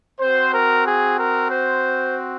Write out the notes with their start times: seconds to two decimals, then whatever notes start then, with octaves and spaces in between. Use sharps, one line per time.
0.20 C4 F#4 C5
0.53 A#4
0.86 G#4
1.18 A#4
1.50 C5